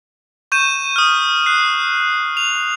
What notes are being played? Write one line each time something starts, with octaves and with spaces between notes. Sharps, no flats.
C#6 G6 D#7 E7
D#6 F6
F#6 C7
F7